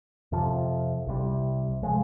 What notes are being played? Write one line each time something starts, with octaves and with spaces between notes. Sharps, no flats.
F2 C3 F3
C2 C3 G3
C3 F3 G#3